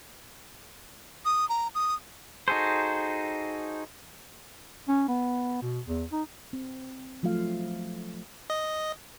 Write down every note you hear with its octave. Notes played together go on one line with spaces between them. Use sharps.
D#6
A#5
D#6
D#4 F#4 G#4 A4 C5
C#4
B3
B2
E2
D#4
C4
F3 F#3 A3 F4 F5
D#5